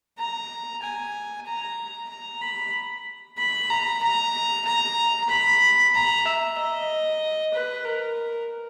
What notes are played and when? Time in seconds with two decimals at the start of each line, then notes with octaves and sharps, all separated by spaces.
0.18 A#5
0.82 G#5
1.46 A#5
2.09 A#5
2.42 B5
3.38 B5
3.70 A#5
4.02 A#5
4.65 A#5
5.29 B5
5.94 A#5
6.25 E5
6.58 D#5
7.54 B4
7.85 A#4